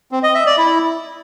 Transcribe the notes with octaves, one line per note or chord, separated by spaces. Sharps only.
C4
D#5
E5
D5
E4